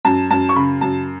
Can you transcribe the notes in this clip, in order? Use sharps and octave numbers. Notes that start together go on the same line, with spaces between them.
F#2 A5
F#2 A5
C#6
C#3 B5
F#2 A5